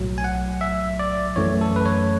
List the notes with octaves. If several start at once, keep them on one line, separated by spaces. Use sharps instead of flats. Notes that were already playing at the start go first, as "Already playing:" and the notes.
Already playing: B1 A2 F#3
G#5
F#5
E5
D5
F#2 E3 A3 C#5
A4
B4
C#5